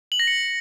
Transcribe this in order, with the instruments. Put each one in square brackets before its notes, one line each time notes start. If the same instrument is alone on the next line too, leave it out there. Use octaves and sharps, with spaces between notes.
[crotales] F#7
A#6
C#7